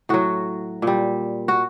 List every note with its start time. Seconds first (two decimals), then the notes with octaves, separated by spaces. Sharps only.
0.09 A2 F#3 F#4
0.82 A#2 G3
1.48 F#4